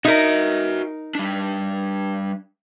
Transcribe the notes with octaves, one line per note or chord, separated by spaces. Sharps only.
D#4 F#4 A#4 E5
G3 D4